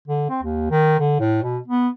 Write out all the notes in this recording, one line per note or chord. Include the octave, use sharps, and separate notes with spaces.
D3
C4
D#2
D#3
D3
A2
B2
B3